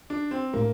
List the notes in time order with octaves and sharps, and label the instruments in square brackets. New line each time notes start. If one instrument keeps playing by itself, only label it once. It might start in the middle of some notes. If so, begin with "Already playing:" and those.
[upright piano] D4
C4
[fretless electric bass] A2 A3 D4 [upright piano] A#3